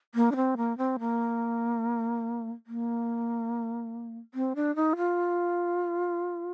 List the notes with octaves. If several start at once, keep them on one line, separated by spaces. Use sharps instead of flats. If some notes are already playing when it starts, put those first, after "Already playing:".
A#3
D4
C4
A#3
C4
A#3
A#3
C4
D4
D#4
F4